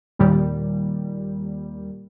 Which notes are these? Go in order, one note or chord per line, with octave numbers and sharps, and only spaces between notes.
D#2 A#2 G3